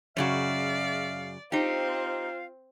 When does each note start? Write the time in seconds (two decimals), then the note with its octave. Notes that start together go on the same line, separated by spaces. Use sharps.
0.17 F#2 C#3 F#4 G#4 D5 E5 F5
1.52 C4 D#4 F4 G4 C5 F5